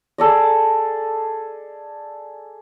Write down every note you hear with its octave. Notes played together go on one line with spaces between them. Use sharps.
G#4 A4 D5 D#5